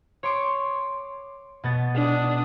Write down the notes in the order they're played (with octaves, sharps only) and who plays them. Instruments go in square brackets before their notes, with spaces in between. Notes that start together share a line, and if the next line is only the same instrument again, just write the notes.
[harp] C#5 C6 D6
B2 B3 A6
[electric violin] D4 D#6